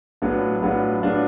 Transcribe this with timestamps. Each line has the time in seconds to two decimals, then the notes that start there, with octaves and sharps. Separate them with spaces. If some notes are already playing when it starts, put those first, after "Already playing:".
0.22 A2 F#3 B3 D4 F4
0.62 A2 F#3 B3 D4 F4
1.02 A2 F#3 B3 D4 F4